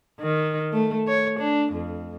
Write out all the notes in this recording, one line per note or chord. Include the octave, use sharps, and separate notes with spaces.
D#3
A3
C#5
D4
F2